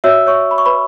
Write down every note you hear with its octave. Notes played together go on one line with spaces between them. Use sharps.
F#4 C#5 E5 E6
C#5 C#6
B5
C#6
B4 B5